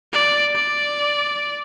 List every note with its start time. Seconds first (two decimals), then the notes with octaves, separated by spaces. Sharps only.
0.13 D5
0.55 D5